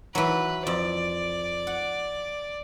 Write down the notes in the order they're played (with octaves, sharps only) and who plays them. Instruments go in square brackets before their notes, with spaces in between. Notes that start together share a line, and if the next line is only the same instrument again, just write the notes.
[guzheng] E3 F#3 [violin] B4
[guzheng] F2 [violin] D5
[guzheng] F#5